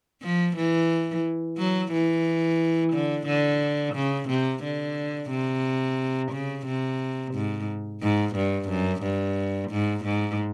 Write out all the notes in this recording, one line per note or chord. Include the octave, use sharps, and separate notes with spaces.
F3
E3
F#3
E3
D3
D3
C#3
C3
D3
C3
C#3
C3
G#2
G#2
G2
F#2
G2
G#2
G#2